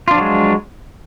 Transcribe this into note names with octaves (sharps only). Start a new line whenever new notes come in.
F3 F#3 G#3 D4 F4